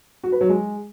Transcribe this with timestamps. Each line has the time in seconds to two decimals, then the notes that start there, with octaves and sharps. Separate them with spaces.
0.24 F#4
0.32 B4
0.41 F#3
0.49 G#3